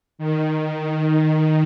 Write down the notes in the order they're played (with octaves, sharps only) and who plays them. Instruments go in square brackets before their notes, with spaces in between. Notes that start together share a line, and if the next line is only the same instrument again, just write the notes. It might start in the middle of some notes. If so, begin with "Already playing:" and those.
[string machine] D#3